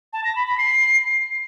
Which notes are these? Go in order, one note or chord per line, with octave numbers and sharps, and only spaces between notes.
A5
A#6
B5
B5
C7